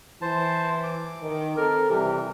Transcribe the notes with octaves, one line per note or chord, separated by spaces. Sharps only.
E3 C5 A5
D6
D#3
C4 A4 A#4
C3 E3 G3 G4